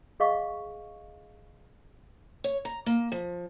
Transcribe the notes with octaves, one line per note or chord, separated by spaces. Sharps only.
G#4 D#5 F5 C#6
C#5
A#5
A#3
F3